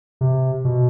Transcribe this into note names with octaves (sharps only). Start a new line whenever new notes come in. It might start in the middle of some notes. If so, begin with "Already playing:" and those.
C3
B2